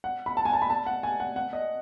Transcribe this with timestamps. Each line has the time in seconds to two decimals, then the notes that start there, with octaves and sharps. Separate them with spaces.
0.04 F#5
0.26 B5
0.37 A5
0.45 G#5
0.53 A5
0.62 B5
0.70 A5
0.87 F#5
1.03 G#5
1.20 F#5
1.36 F#5
1.53 D#5